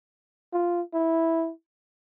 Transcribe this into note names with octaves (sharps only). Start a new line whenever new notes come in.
F4
E4